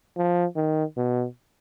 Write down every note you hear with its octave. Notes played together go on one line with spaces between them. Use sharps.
F3
D#3
B2